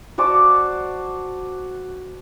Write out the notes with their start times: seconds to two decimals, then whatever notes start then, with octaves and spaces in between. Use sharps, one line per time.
0.18 F#4 C5 D5 A5